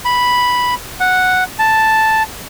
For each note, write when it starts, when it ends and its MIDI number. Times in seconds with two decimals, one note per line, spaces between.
0.05 0.74 83
1.00 1.44 78
1.59 2.23 81